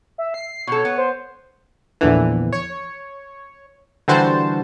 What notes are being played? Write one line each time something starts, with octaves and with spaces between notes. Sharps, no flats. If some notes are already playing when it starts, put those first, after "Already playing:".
E5
C7
B2 A4 C#5
B3
C5
A#1 E2 D3 E3
C#5
D3 E3 G3 F#4 C5 A5